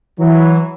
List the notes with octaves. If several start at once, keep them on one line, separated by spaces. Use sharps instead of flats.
E3 F#3